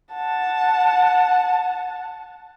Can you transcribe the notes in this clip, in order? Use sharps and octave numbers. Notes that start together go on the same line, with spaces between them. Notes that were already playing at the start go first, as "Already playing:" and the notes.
F#5 A5